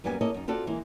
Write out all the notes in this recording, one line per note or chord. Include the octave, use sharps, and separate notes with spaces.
F#2 G3 A#3 B3 G4 G#5
A#3 E4 G#4 A4 C#5 D#5
F#2 D#4
C4 F4 F#4 A4 D5
E3 G#3 A#3 E4